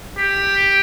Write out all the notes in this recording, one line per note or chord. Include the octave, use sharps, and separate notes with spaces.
G4